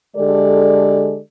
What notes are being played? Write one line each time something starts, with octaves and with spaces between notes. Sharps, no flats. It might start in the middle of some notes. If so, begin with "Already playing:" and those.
D3 G#3 G4 A4 D5